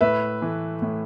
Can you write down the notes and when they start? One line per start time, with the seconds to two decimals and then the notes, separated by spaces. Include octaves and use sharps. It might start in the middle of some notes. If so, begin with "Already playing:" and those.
0.01 A2 B4 E5
0.42 E3 A3
0.82 A2